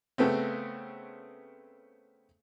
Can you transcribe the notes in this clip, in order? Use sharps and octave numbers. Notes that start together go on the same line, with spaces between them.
C#3 A3 B3 C4